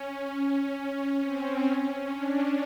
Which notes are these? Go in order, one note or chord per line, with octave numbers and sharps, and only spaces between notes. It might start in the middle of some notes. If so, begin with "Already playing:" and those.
Already playing: C#4
C#4
C4
C#4
D4